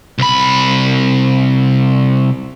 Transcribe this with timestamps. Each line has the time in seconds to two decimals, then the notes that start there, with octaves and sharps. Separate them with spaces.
0.19 C2 B5